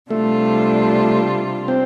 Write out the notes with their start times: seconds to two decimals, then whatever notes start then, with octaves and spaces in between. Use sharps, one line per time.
0.11 C3 G3 A3 D4 F4
1.68 C4